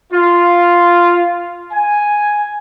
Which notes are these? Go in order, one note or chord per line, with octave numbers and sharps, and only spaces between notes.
F4
G#5